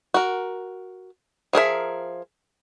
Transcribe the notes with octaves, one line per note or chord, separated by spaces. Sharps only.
F#4 A#4
F3 G#4 A#4 E5